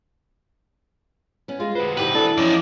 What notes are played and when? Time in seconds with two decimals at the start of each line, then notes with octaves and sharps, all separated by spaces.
1.48 B3 C#4
1.60 G#3 F4
1.75 F#4 B4 C5
1.97 C3 D#3 E3 G4 B4
2.15 E3 D4 A4
2.38 E2 F3 C#4 D#4 D5